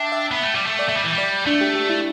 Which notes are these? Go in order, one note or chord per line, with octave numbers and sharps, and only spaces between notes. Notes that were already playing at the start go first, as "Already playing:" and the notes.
Already playing: D4 E5 G5
E5
B3
A3
G3
A3
D5
A3 E5
G3
E3
G3
D5
A3 D4
G4
G4
E4